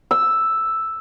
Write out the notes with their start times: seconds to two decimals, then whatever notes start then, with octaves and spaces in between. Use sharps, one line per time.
0.11 E6